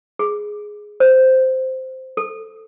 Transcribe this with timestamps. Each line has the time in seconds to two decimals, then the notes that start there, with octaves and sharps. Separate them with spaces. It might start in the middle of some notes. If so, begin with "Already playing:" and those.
0.19 G#4
1.00 C5
2.17 A4